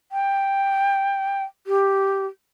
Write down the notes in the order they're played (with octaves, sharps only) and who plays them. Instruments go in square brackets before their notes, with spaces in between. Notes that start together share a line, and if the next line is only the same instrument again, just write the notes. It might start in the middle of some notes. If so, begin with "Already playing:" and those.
[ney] G5
G4